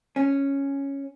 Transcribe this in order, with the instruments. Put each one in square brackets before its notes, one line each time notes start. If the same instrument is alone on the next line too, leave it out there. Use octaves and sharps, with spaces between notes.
[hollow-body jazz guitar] C#4